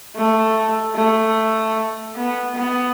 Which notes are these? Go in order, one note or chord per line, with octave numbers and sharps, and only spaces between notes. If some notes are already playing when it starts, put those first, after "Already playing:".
A3
A3
B3
B3